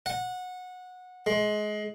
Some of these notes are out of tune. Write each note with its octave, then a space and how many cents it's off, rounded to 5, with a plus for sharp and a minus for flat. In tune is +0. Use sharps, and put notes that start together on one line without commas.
F#5 -20
G#3 +25